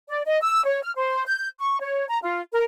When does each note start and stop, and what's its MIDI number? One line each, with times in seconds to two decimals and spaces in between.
0.08 0.22 74
0.26 0.41 75
0.42 0.64 88
0.64 0.82 73
0.83 0.92 89
0.96 1.25 72
1.27 1.47 91
1.60 1.78 85
1.80 2.05 73
2.09 2.18 82
2.23 2.41 65
2.52 2.63 70